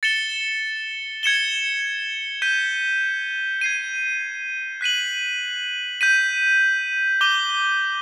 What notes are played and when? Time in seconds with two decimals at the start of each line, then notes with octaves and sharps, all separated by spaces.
0.03 A6 C#7 E7 G7
1.23 G#6 C#7 E7 G7
2.42 G6 B6 D#7 G7
3.61 G#6 C7 D#7
4.81 F#6 B6 D#7 F#7
6.01 G6 B6 D#7
7.20 D6 G6 A#6 D#7 G7